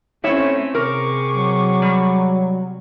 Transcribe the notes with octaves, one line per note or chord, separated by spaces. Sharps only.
A2 C4 C#4 C#5 E5
C3 G#4 A#4 C#6 D6
F#3
G3